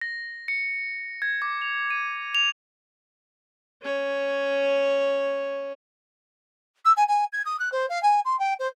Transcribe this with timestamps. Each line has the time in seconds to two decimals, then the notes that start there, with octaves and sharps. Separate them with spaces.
0.01 A#6
0.48 C#7
1.22 G#6
1.42 D6
1.62 F7
1.90 D#7
2.35 F7
3.82 C#4 C#5
6.85 E6
6.97 G#5
7.08 G#5
7.33 G#6
7.46 D#6
7.60 F#6
7.72 C5
7.89 F5
8.03 G#5
8.25 C6
8.39 G5
8.59 C5